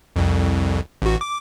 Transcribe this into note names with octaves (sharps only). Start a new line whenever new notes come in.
C2 F2
A1 F#4
D6